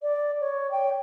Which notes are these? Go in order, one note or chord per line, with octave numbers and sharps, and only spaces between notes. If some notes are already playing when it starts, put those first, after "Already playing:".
D5
C#5
G5